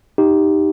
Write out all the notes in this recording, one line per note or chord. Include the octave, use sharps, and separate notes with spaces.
D#4 G4